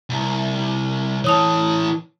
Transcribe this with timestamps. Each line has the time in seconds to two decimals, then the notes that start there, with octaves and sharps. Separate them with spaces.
0.10 C2
1.24 E3 A4 C#5 D#6 F7